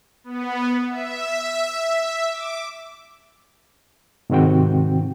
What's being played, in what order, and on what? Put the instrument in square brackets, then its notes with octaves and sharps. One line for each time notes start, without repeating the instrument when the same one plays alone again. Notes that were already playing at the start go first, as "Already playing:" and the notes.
[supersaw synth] B3
E5
D6
[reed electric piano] G#2 C3 D#3 C4 F#4 G5